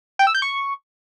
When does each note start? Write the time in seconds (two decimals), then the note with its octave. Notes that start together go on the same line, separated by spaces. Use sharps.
0.19 G5
0.27 E6
0.35 G6
0.42 C#6